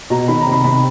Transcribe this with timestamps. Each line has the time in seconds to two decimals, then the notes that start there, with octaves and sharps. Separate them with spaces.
0.10 B2 A#5
0.28 D#3 B5
0.40 A#5
0.46 C3
0.52 B5
0.64 C3 B5